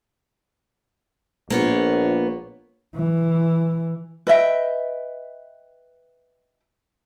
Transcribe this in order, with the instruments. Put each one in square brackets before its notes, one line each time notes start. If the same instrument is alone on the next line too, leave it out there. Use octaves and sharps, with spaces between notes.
[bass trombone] A#1 [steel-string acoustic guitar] A#3 B3 C#5
[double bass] E3
[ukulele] B4 D#5 E5 G5